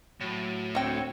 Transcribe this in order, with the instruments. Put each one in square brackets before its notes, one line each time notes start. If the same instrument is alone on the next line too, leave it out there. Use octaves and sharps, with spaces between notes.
[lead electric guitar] A2 [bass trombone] F#3
[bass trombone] D2 [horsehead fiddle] C4 C#5 [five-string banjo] F#4 G5